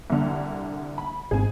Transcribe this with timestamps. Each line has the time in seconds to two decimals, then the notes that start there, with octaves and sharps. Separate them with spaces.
0.10 C2 D3
0.98 B5
1.31 G#1 G#2 C4 G#4 G#5